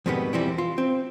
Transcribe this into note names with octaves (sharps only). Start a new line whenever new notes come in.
F2 G#2 B2 D#3 G3 B3
E3 F3 G3 C4 E4
F4
C4